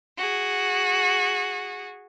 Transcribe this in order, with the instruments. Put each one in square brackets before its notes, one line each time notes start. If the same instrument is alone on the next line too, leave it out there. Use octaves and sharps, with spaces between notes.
[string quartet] F#4 G#4